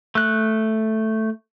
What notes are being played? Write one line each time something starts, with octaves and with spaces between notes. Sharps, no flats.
A3 F#6